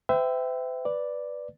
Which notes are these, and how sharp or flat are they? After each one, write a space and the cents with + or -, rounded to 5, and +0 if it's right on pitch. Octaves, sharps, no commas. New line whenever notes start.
C5 -45 E5 +0 G5 +0
B4 +0 D5 +0